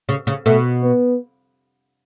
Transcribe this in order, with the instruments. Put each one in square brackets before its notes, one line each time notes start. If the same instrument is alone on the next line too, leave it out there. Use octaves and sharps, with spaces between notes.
[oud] C#3
C#3
[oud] B2 [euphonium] A3
[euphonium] B3